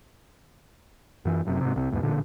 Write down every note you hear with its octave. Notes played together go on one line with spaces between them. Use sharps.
F#2 E3
F#1 F#2 C3
G#2 C3
C2 C3
A1 E2 G#2 B2
A1 A#2 D3